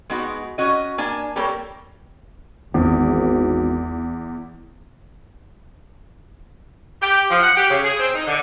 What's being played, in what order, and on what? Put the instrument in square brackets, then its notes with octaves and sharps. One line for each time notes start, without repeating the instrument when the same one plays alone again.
[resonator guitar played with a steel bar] G#3 B3 D#4 F#4
C#4 F#4 D#5
A#3 D4 G#5
G3 A#3 A4 A#4 C#5
[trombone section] G#1 [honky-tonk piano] E2
[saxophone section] G4
F3
F#5
G4
C#3
G#4
C4
D#4
D3